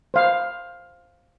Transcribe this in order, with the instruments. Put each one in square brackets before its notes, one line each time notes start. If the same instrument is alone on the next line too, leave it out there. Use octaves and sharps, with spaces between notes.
[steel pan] C5 F5